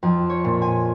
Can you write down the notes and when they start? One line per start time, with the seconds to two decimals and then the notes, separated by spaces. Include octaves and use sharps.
0.03 F2
0.30 C#5
0.45 A#2
0.62 G#5